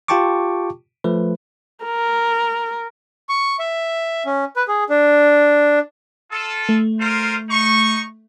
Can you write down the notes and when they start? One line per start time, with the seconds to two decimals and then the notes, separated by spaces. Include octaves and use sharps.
0.08 F4 G4 G5 A5 C#6 D6
1.04 F3 A3 B4
1.85 A#4
3.29 C#6
3.59 E5
4.25 C#4
4.56 B4
4.68 G#4
4.89 D4
6.31 F4 A4
6.69 A3
7.00 F4 A#4 C5
7.50 D#4 C#6